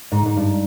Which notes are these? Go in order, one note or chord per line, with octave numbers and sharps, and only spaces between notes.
G#2
G#2
G2